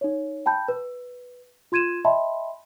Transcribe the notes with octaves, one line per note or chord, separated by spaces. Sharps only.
D#4 C#5
G5 A5 B5 G6
B4
F4 C6 G#6 D#7 E7
D#5 E5 G5 A5 B5 C6